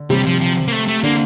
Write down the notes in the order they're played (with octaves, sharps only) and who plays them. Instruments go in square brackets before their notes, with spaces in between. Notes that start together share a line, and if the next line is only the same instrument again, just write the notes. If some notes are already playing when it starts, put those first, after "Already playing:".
Already playing: [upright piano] D3
[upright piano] C3 [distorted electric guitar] G3
[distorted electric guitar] F3
F3
A#3
A3
A3
[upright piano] D3 [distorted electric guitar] A#3